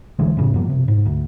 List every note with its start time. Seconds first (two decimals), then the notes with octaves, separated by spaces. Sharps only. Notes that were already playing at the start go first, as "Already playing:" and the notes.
0.19 B1 D3 E3 G#3
0.37 F2 A2 C#3
0.54 G2 B2 F3 A#3
0.69 C3
0.88 G#2
1.06 D2